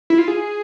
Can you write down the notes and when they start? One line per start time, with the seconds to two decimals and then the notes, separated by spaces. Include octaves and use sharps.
0.10 E4
0.19 F4
0.28 G#4